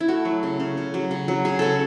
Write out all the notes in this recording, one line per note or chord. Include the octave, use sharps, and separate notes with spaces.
E4
A3 F#4
F#3
C#3
C#3
C#3
F#3
C#3
F#3
C#3 G#4
C#3 A4